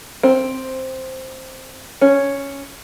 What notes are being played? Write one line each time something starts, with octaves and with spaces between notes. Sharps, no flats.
C4
C#4